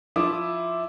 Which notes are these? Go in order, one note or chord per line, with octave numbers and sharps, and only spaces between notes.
F3 E4 E5 D6 D#6